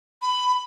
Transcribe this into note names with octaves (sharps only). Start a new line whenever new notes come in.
B5